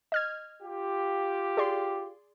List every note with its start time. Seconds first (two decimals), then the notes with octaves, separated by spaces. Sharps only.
0.12 D#5 F6 G#6
0.63 F4 G4
1.57 G#4 D5 C6